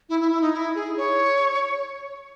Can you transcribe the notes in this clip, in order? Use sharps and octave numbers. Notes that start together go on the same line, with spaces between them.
E4
E4
E4
D#4
E4
G#4
C#5